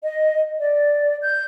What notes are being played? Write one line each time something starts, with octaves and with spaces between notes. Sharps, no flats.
D#5
D5
G6